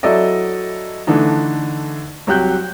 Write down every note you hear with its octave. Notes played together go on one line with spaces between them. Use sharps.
F#3 E4 A4 D5 D#5
D3 E3 A3 D4 D#4
C2 F#3 G4 F#6 G6